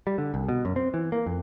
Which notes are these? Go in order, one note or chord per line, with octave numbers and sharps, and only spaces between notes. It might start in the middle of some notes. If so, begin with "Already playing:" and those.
G3
D3
C2
B2
F#2
C4
E3
A#3
F2